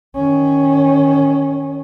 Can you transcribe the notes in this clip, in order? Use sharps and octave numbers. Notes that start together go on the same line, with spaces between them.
D#3 C#4